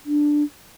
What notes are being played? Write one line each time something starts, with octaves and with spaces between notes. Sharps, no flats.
D4